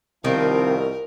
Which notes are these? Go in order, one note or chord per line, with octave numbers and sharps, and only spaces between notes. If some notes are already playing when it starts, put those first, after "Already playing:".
C2 D#3 F3 C4 A#4